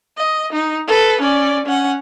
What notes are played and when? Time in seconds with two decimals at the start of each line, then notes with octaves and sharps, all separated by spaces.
0.17 D#5
0.52 D#4
0.87 A4 B4
1.21 C#4 D5
1.66 C#4 F#5